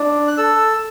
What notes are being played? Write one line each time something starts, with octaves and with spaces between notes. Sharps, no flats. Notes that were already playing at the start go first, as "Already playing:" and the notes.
Already playing: D4
F#6
A4 E6